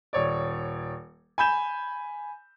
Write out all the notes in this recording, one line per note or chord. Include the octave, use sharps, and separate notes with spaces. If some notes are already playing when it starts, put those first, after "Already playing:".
D#1 C#5 D5
G#5 B5 G6 E7